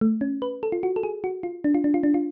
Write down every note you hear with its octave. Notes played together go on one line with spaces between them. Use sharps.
A3
C#4
B4
A4
F4
F#4
A4
G#4
F#4
F4
D4
F4
D4
F4
D4
F4